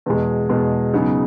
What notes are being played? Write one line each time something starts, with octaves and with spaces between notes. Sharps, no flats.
E2 B2 G#3
E2 B2 G#3
C#3 F#3 B3 D#4 G#4